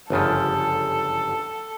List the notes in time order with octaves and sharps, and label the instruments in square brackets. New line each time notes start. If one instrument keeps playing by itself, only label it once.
[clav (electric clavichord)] G1 F#2 C#3 F3 [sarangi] A4